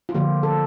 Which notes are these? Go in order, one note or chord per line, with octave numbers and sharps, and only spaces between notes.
F4
D3 F3 A#3 G4
A4